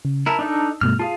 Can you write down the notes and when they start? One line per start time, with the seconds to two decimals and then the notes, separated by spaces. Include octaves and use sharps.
0.05 C#3
0.26 E4 A#4 E5 A5 A#5
0.39 D4 D#4 A4
0.81 G2 B2 A3 F6
0.99 F4 G#4 F5 A5